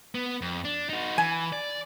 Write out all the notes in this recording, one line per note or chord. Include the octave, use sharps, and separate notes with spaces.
B3
F2
D4
D#4 F#4
E3 G#5
D5